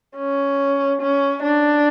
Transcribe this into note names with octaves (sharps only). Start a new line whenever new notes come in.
C#4
C#4
D4